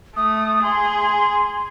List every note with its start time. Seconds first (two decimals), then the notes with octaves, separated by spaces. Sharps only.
0.16 A3 D#6
0.63 G#4 C6